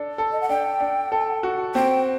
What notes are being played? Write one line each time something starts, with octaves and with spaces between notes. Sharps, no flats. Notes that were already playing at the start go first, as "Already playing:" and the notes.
Already playing: D4 A4
A4
D#5
F#5
D4 G5
D4
A4
F#4
C4 G5